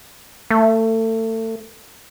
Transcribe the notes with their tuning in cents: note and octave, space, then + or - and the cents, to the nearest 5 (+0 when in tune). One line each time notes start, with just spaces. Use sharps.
A3 +30